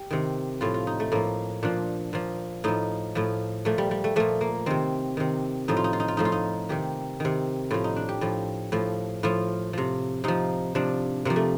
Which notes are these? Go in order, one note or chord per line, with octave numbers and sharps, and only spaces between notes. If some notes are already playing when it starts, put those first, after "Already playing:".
Already playing: G4
C3 D#3
A2 F3 F4
F4
D#4
A3
A2 F3 A#3
A#2 F3 D4
A#2 F3
A2 F3 D#4
A2 F3
A#2 F3 A3
G3
G3
A3
A#2 F3 A3
A#3
C3 D#3 C4
C3 D#3
A2 F3 D#4
F4
D#4
F4
D#4
F4
A2 F3 D#4
F4
D#4
C3 D#3 G4
C3 D#3
A2 F3 F4
D#4
D4
G4
A2 F3
A2 F3
A2 F3 F4
C3 F3
C3 F3 D#4
C3 F3 D4
C3 F3 A#3
A3